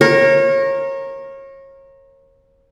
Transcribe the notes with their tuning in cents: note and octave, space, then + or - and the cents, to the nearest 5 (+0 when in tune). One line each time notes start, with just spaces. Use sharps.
A#4 +0 C#5 -30